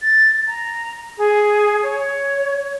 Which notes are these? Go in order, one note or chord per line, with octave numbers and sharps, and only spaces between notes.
A6
A#5
G#4
C#5